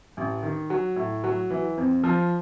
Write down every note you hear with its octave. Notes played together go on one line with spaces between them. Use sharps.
A1
D#3
F#3
A2
F#3
E3
F2
F3